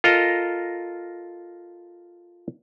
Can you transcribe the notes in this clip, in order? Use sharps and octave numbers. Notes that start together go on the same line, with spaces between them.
F4 A4 A#4 D#5 A#5